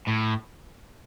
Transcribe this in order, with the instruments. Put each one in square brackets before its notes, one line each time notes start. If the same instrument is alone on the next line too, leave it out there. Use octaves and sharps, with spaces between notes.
[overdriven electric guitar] A2